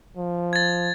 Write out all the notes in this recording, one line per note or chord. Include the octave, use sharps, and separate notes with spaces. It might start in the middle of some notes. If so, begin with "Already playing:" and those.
F3
G#6 A6